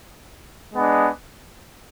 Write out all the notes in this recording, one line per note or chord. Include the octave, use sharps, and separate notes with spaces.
G#3 B3 D4